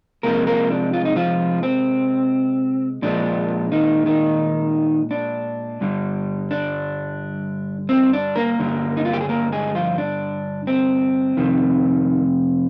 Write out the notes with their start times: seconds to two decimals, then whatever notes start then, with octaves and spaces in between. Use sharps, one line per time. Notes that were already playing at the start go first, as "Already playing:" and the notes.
0.23 C3 F3 G#3 A#3 A#4
0.47 A#3 A#4
0.70 D4
0.93 F4
1.05 D#4
1.16 F3 F4
1.63 C4
3.02 A#2 F3 G#3 D4
3.72 D#3 D#4
4.06 D#3 D#4
5.11 D4
5.81 G2 D3 G3
6.51 D4
7.89 C4
8.13 D4
8.36 A#3 A#4
8.59 G2 D3 G3
8.97 D#4
9.05 F4
9.13 G4
9.21 G#4
9.29 A#3 A#4
9.52 G#3 G#4
9.75 F3 F4
9.98 D4
10.67 C4
11.37 F2 C3 D#3